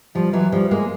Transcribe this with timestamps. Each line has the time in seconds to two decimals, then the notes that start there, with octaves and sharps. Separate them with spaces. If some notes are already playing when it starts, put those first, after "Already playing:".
0.15 F3 G3
0.33 E3 F#3
0.52 F3 G3
0.71 G#3 A#3